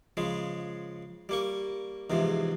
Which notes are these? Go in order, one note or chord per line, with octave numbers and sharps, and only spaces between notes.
C#3 F3 G#3
G3 A#3 C#6
E2 G#2 C3 F3